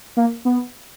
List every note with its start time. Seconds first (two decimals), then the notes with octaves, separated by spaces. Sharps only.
0.17 A#3
0.45 B3